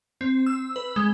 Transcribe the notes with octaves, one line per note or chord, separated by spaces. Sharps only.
C4
E6
B4
G#3